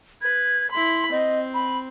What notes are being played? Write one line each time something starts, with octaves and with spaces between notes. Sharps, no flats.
B4 G#6
E4 B5 C6
C4 D#5
B5